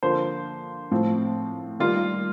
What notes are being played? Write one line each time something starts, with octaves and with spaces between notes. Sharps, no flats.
D3 F3 A#3 C5
A2 F3 C4
D#3 G3 A#3 F4